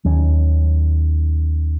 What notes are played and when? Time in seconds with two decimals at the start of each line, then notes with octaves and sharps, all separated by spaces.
0.05 D#2 D#3 F#3 C#4